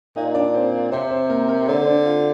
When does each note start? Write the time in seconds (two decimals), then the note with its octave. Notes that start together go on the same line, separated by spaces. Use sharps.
0.16 A#2 D#4 D#5
0.35 D4 D5
0.54 C4 C5
0.92 C3 C4 C5
1.11 C4 C5
1.30 A#3 A#4
1.48 A#3 A#4
1.67 D3 C4 C5
1.81 C5
1.86 D4 D5
2.05 F4 F5